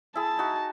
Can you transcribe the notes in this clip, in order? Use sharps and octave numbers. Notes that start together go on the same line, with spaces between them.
E4 G#4 A5
D#4 F#4